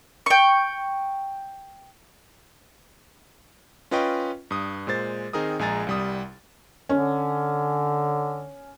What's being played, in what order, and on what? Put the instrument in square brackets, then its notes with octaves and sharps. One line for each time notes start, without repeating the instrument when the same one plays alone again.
[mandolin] G5 C#6
[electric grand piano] C#4 F4 B4 D#5 G5 C#6
G2 D#6
A#2 G#3 C5 A6
D#3 C4 D#4 G#4 A#4 D#6
A#1 G#3 G#5 A#5 A6
C2 G3 D#6
[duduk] D3 [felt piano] C#4